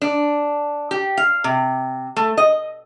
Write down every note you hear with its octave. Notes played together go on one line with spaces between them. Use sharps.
D4
G4
F5
C3
A3
D#5